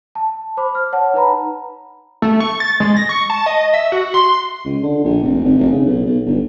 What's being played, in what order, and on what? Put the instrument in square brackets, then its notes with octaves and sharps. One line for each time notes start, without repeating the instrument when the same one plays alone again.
[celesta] A5
C5 B5 D6
F6
C#5 F#5 A5
D#4 B4 A#5 B5
[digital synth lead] A3
C#6
A6
G#3
A#6
C#6
A5
D#5
E5
F#4
C6
[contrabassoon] C#2
D3
A#1
F1
G#1
F1
C#3
B1
B1
G1